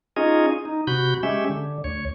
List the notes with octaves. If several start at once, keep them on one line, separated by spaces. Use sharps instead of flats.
C#4 D#4 F4 G#4 D#5
D#4
C3 F#4 B5 G6
G#3 C#4 G4 E5
D3
D2 C#5